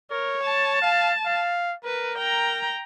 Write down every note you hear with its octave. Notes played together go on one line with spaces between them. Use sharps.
A#4 C#5
A5
F5
F5
A#4 B4
G5 A#5